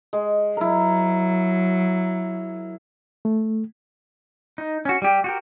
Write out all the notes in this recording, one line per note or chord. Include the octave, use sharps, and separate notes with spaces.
G#3
F#3 E4 A#4
A3
D#4
C#4 F#4
G3 G4
F#4 G4 A#4